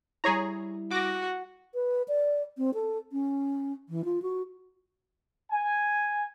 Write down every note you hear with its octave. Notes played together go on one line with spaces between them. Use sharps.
G3 E4 G#4 C#5 A#5
F#4 D6 A#6
B4
D5
C4
A4
C#4
E3
F4
F#4
G#5